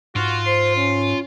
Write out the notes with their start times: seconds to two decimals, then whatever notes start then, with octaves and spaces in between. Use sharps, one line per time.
0.16 G#2 F4 F#4
0.47 C5 C6
0.77 C#4